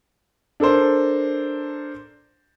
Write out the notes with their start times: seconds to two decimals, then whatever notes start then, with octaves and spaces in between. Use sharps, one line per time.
0.60 D4 A4 A#4 C5